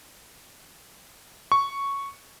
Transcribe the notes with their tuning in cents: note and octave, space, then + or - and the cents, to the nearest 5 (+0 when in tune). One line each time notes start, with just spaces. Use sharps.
C#6 +0